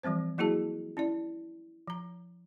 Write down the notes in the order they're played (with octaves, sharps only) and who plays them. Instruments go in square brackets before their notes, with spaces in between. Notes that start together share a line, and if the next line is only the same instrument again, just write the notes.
[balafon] E3 F3 G3 C4 C5
F#3 A#3 E4 F#4 G#4 A5
C#4 E4 D5
F3 A#5